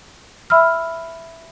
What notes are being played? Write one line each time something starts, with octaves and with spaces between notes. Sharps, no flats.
E5 B5 E6 F6